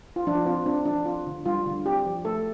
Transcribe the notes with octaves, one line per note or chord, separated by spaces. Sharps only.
F4
F3 D4
C4 F4
C4 D4
F3 D4
C4 F4
D3
G3 F4
D3
C4 G4
F3
A3 A4